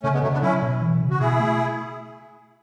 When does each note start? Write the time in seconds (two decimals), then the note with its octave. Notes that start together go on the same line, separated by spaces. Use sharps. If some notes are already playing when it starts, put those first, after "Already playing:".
0.03 C#3 A3 C#4
0.13 G#3 B3
0.22 C#3 F#3 A3
0.33 B3 D4
0.42 F#3 C#4 E4
0.62 B2
0.81 E3
1.01 C#3
1.10 F#4
1.19 B2 E4 G#4
1.39 A3